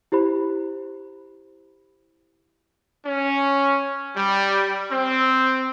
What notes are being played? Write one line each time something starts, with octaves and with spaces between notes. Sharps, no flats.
E4 G4 C5 B5
C#4
G3
C4